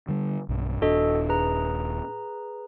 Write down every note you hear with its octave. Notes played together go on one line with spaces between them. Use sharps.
D3 G3
B1 G2
D#1 D4 F#4 A4 D#5
G#4 B4 A#5